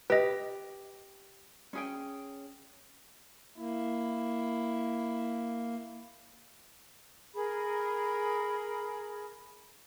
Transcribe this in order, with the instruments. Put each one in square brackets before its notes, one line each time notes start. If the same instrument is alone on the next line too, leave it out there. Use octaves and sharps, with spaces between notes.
[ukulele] G4 [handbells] B4 D#5
[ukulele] C#4 G#4 G5
[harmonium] A#3 [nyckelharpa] E4
[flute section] G#4 A#4 B5